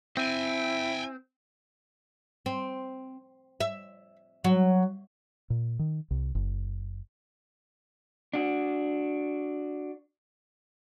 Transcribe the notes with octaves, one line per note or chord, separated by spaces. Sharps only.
C4 E4 G5 G#5
C4
E5
F#3
A#2
D#3
C2
F#1
D4 F#4